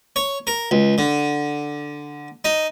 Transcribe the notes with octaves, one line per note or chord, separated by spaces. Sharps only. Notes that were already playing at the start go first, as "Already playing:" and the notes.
C#5
A#4
C#2
D3
D#4